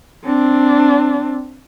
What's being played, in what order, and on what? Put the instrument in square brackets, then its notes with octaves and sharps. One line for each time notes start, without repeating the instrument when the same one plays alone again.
[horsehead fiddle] C4 D4